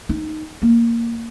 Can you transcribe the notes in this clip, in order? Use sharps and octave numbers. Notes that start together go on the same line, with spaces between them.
D#4
A#3